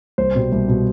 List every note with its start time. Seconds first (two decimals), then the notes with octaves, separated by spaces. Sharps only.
0.18 C2 C5
0.35 B2 G3
0.52 C2
0.68 B2 G3